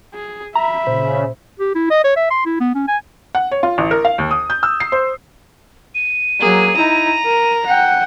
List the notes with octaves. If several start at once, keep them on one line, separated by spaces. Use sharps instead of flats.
G#4
E5 A#5 B5
A#2 C#3 C5
G4
E4
D#5
C#5
E5
C6
E4
B3
C#4
G#5
F#5
C#5
F4
A1
A#4
F5
D#2
D#6
G6
E6
C7
C5
D#7
F#3 A#3 G#4
D#4 E4 A#5
A#4
F#5 G5